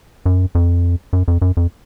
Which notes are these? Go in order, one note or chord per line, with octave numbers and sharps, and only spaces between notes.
F#2
F2
F#2
F2
F#2
F2